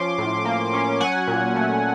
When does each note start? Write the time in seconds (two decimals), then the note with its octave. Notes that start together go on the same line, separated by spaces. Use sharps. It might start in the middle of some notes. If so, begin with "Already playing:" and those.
Already playing: F3 C#4 C6 D6
0.18 A2
0.45 A#3
0.74 C#4
1.01 F#3 F#5 G#5
1.27 A#2
1.56 A3